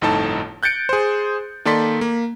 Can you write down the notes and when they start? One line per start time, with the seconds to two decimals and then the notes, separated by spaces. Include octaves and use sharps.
0.01 G1 F2 A2 D#4 A4 A5
0.63 F#6 G6 A6 C#7 D7
0.89 G#4 C5
1.65 D#3 A#3 A4 D5 C6 B6
2.01 A#3